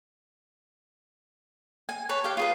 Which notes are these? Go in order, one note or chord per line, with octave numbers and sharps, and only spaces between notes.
G#5
B4 C#5 A5
G4 F5 G5
F4 G#4 B4